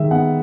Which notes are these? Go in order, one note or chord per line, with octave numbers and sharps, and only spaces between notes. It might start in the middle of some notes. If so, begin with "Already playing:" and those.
Already playing: D#3 G#3 E5
B3 F#5